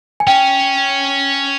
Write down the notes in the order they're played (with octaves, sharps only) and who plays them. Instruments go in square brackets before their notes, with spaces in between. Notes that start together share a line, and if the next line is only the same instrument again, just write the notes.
[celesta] G#5
[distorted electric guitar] C#4 [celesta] G5